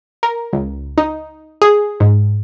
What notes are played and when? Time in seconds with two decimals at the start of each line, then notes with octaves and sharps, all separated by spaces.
0.23 A#4
0.53 C#2
0.98 D#4
1.62 G#4
2.00 G#2